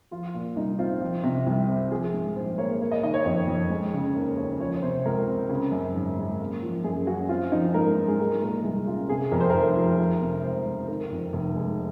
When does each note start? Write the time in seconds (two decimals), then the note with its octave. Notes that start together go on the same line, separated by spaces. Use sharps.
0.11 F3 F4
0.34 A#2
0.56 C2 D#4
0.79 C4 F4
1.01 F3
1.24 C3
1.46 C2
1.68 C4
1.91 F3 G#4
2.13 G#2
2.36 A#1 C5
2.58 A#3 C#5
2.81 A#3
2.91 D#5
3.03 D#3 D#5
3.14 C#5
3.25 F2
3.48 F2
3.70 G#3
3.93 C#3
4.15 D#2 A#4
4.37 C#4 C#5
4.60 F3 C#5
4.82 C3 C5
5.05 C#2 A#4
5.28 C4
5.49 C#3
5.72 F#2
5.94 G#1
6.17 G#3
6.40 A#3
6.63 F3
6.84 F#2 G#4
7.07 C#4 F#4
7.29 C4 F4
7.52 F3 D#4
7.74 G#2 A#4
7.97 G#2
8.08 G#4
8.19 G#3 A#4
8.41 A#2 A#4
8.64 C2 G#4
8.86 C#4 F4
9.08 C3 G#4
9.32 F2 A#4
9.41 C5
9.50 F1 A#4
9.76 F3
9.99 F3
10.21 C3
10.43 C#2 C5
10.66 C#2
10.88 D#3 A#4
11.11 F2
11.33 F1
11.55 G#3